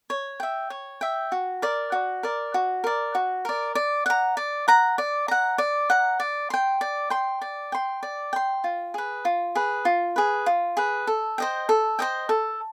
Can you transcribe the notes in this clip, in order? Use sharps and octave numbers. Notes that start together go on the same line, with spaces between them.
C#5
E5 G5
C#5
E5 G5
F#4
A#4 D5
F#4
A#4 D5
F#4
A#4 D5
F#4
A#4 D5
D5
F#5 A#5
D5
F#5 A#5
D5
F#5 A#5
D5
F#5 A#5
D5
G5 C6
D5
G5 C6
D5
G5 C6
D5
G5 C6
F4
G#4 B4
F4
G#4 B4
F4
G#4 B4
F4
G#4 B4
A4
C5 D#5 G5
A4
C5 D#5 G5
A4